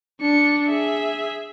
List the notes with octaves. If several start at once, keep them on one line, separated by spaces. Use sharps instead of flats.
D4 C#7
G#4 E5